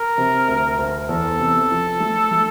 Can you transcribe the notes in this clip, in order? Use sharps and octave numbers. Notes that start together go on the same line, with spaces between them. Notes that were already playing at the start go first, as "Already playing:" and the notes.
Already playing: A#4
C3
D2
D2
E2 A4
C3
F3
A3
A3